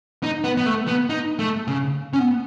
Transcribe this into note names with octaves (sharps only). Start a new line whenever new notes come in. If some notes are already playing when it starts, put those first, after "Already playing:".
D#4
B3
B3
A3
B3
D#4
A3
C#3
C#4
B3